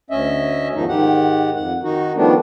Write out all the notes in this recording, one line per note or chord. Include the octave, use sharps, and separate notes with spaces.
D2 C#4 D#5 E5
E2 G#2 D#3 F3 D#4
G#2 D#3 G4 F#5
F2 F#5
D#3 D#4 F#4
D#3 F3 G3 A3 B3 D4